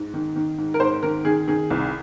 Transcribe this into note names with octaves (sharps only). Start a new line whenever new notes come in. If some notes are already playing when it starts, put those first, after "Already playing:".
Already playing: G#2
D#3
D#3
G#2
A#4
G#2 C5
D#3 A#4
D#3 G#4
D#3 G#4
C2